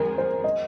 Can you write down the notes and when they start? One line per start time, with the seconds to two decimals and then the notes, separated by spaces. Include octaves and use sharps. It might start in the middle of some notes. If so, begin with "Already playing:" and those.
Already playing: F2 D#3 G#3 C4 G#4 A#4
0.18 C5
0.44 D#5